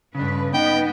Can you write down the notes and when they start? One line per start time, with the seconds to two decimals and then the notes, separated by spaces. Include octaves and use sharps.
0.15 G2 C#3 D4 B4
0.54 B3 D#4 D#5 G5